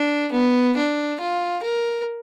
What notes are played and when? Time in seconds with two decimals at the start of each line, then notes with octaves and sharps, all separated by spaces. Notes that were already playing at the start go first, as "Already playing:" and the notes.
Already playing: D4
0.32 B3
0.77 D4
1.20 F4
1.63 A#4